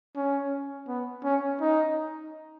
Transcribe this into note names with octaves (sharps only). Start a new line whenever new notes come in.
C#4
B3
C#4
D#4